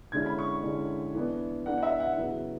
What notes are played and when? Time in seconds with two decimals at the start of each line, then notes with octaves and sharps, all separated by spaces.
0.12 D3 G#3 C#4 E4 G#6
0.26 B5
0.39 C#6
0.63 D3 G#3 C#4 E4
1.15 E3 B3 D4
1.66 E3 B3 D4 F#5
1.78 F#5
1.82 E5
2.00 F#5
2.16 C#3 F#3 B3 E4